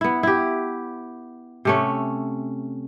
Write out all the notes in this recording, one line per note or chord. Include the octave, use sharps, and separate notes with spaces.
B3 E4
E4 G4
C3 A3 C#4